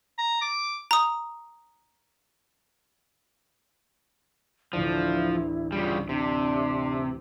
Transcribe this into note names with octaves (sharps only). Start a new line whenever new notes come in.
A#5
D6
A#5 D#6
A1 D2 F3 E4 D5
C#3 G3 F4
C3 D4